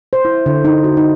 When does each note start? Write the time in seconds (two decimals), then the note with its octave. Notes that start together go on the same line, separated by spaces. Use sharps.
0.13 C5
0.25 E4
0.46 D3
0.65 D#4
0.84 F#4
0.97 D#4